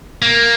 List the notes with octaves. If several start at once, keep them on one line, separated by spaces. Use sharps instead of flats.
A#3